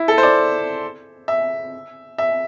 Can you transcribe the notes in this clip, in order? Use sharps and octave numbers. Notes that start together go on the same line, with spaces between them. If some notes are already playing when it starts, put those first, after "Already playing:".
Already playing: E4
A4
C5
D5
E5
E5